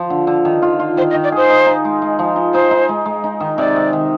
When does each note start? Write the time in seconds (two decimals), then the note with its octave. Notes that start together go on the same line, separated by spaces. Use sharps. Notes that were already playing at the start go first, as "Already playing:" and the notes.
Already playing: F3
0.10 D3
0.27 D3
0.45 D#3
0.62 F4
0.79 F4
0.97 D#3 C5
1.11 D#5
1.14 D#3
1.24 D5
1.32 G#4 C5
1.50 D#4
1.67 D#4
1.85 G#3
2.02 G#3
2.19 F3
2.36 D#4
2.54 D#4 C5
2.71 D#4
2.89 G#3
3.06 G#3
3.24 D#4
3.40 D#3
3.58 C3 D5
3.76 C3
3.93 D#3